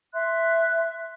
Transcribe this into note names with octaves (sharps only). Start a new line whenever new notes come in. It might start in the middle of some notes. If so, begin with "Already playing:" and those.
E5 C6 F#6